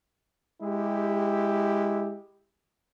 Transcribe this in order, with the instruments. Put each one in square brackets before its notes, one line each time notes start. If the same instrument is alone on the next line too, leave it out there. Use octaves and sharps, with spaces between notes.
[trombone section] G#3 E4 G4